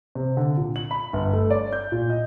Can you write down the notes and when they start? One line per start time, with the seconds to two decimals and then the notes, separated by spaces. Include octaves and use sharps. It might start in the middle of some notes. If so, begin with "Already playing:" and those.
0.15 C3
0.37 D3
0.57 A#2
0.76 F#7
0.91 B5
1.13 G1
1.33 A3
1.50 D5
1.73 G6
1.92 A#2
2.10 D#5